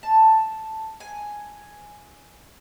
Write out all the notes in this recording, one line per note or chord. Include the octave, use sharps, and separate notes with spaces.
A5
G#5